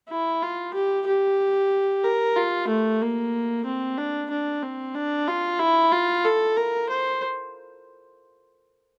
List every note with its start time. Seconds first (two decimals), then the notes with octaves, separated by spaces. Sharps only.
0.09 E4
0.42 F4
0.74 G4
1.06 G4
2.04 A#4
2.36 F4
2.68 A3
3.01 A#3
3.65 C4
3.98 D4
4.30 D4
4.63 C4
4.95 D4
5.27 F4
5.59 E4
5.92 F4
6.24 A4
6.56 A#4
6.89 C5